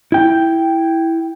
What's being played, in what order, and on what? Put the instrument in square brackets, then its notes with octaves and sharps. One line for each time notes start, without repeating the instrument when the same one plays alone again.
[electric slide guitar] E4 G5